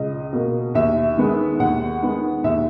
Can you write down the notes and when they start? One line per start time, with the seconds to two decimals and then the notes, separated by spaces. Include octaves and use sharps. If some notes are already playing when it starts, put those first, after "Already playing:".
Already playing: C#2 D#5
0.33 B2 A#3
0.74 D#2 E5
1.17 D#3 G#3 B3
1.60 D#2 F#5
2.02 D#3 G#3 B3
2.44 D#2 E5